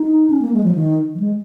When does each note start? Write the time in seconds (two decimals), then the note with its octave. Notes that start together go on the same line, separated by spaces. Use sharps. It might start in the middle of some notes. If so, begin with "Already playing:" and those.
Already playing: D#4
0.30 C#4
0.42 A#3
0.53 G#3
0.64 F3
0.75 D#3
1.15 F3
1.20 G#3